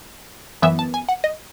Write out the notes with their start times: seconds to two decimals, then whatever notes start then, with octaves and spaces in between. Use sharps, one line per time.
0.62 F#2 E3 B3 E5
0.79 A5
0.94 G#5
1.09 F#5
1.24 D#5